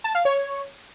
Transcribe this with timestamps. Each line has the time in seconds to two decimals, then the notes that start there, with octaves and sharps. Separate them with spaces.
0.04 A5
0.15 F5
0.25 C#5